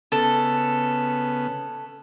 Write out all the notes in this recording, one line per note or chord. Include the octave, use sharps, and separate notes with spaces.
C#3 B3 A4